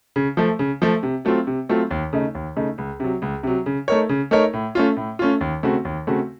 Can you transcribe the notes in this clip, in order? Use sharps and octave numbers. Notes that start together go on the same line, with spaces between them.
C#3
F3 A3
C#3
F3 A3
C3
F#3 A3 C4 F4
C3
F#3 A3 C4 F4
D#2
C#3 A3 D#4
D#2
C#3 A3 D#4
C#2
C3 F#3
C#2
C3 F#3
C#3
A3 D#4 A#4 C#5
C#3
A3 D#4 A#4 C#5
A2
A3 C#4 F4
A2
A3 C#4 F4
D#2
C#3 A3 C4 F#4
D#2
C#3 A3 C4 F#4